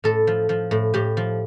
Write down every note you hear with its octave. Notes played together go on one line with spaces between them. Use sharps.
A2 A4
F3
F3
A2
A2 G4
F3